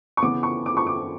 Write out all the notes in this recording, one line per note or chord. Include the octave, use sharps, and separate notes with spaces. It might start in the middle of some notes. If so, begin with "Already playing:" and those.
C#6
C#3 E3 B3 D6
C#6
D6
C#6
D6